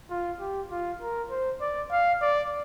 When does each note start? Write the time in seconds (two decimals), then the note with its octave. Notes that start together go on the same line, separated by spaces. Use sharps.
0.10 F4
0.40 G4
0.71 F4
1.01 A#4
1.30 C5
1.61 D5
1.92 F5
2.22 D5